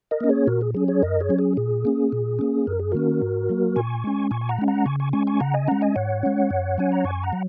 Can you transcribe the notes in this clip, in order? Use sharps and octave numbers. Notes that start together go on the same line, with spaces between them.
A#4 D#5
A#3 C#4
G#4 C#5
A#2 F#4 A#4
G#4
F#3 C#4 G#4
G#4 C#5
F#2 A#4 D#5
G#4 C#5
F#3 C#4
G#4
A#2 G#4
A#3 C#4
A#2
A#3 C#4
F#2 A#4
G#4
D#3 A#3 C#4 F#4 A#4
G#2
F#3 A#3
A#2 G#5 C#6
G#3 C#4
A#2 G#5 C#6
G#5
F#5 A#5
G#3 C#4
F#5 A#5
C#3 G#5 C#6
G#5 C#6
G#3 C#4 G#5 C#6
G#5 C#6
C#3 F#5 A#5
D#5 G#5
G#3 C#4 F#5 A#5
D#5 G#5
G#2 C#5 F#5
G#3 C#4
F#2
F#3 C#4 G#5
A#5
F#2 G#5 C#6
F#5 A#5
F#3